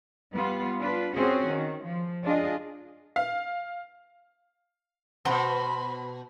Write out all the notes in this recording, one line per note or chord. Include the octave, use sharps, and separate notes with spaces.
G3 B3 F4
D4 F4 B4
C4 C#4 F#4 G#4 C#5
D#3
F3
D4 F4 G#4 D#5
F5
F2 B2 F#4 C5 B5